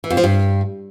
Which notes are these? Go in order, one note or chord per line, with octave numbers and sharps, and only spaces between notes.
E3
F2
F3
G2